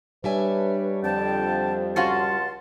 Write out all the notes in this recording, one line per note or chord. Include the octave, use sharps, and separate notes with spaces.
G3 D4 B4 C#5 E5 G#5
F2 D3 G5 A5
C#2 C#4 F4 F#4 A5 C6